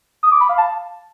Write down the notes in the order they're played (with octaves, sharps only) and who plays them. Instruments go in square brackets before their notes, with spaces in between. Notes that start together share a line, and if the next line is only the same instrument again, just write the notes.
[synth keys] D#6
D6
B5
F5
A5